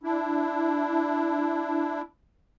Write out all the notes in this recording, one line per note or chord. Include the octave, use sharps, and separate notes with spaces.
D4 E4